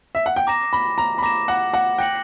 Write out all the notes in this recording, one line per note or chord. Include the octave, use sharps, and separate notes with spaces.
E5
F#5
G5
A#5 D6 A#6 E7
B5
A#5
B5
A#5 D6 A#6 E7
F#5
F#5
G5 F#6 A#6 C#7 F#7